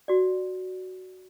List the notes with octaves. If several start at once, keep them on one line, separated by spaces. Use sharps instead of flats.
F#4 D5